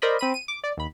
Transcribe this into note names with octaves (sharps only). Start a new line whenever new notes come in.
A#4 C5 D5 D#5 B5
C4 B5 D#7
D#7
D6
D5
D#2 B5